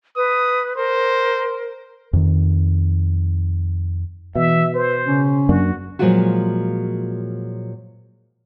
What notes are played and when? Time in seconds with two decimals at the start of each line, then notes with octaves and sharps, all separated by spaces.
0.16 B4 D#6
0.77 A#4 C5
2.13 F2 D#3
4.35 B2 E3 E5
4.74 B4 C5
5.07 C#3 C#4
5.49 F#2 A#3 D4 F#4
5.99 A#2 F3 F#3 G#3 F4 F#4